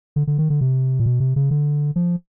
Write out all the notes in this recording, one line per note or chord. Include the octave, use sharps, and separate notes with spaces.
D3
D3
D#3
D3
C3
A#2
B2
C3
C#3
D3
F3